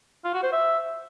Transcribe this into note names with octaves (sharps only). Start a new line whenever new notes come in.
F4
F#4
C5
E5